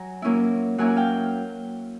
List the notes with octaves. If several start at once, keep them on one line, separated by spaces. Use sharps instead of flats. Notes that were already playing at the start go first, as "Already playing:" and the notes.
Already playing: F#3 G#5 A#5
F#3 A#3 C#4 E4
F#3 A#3 C#4 E4 F#5 G#5
F5 G5